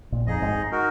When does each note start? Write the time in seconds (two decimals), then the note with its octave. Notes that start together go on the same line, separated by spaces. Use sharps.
0.12 A#1 A#2
0.27 F2 D#4 G#4 D#5
0.42 G#1 G#2
0.71 D#4 F#4 A#4